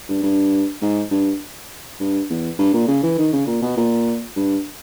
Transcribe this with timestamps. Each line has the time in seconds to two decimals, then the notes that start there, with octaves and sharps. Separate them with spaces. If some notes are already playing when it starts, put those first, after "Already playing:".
0.09 G2
0.23 G2
0.82 G#2
1.11 G2
2.00 G2
2.30 E2
2.59 G2
2.73 A#2
2.88 C#3
3.03 E3
3.18 D#3
3.33 C#3
3.47 A#2
3.62 B2
3.77 A#2
4.36 G2